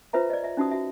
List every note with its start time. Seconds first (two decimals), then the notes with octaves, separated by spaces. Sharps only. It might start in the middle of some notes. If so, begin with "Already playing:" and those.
0.13 F4 B4 C5 E5 A#5
0.30 D5 D#5
0.44 E5
0.57 C#4 D#4 F#4 E5 D#6
0.71 F#4 E5